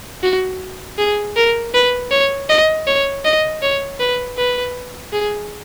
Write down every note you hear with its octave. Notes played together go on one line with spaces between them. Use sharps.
F#4
G#4
A#4
B4
C#5
D#5
C#5
D#5
C#5
B4
B4
G#4